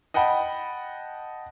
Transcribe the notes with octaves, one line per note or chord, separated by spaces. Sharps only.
D#5 F#5 G5 A5 B5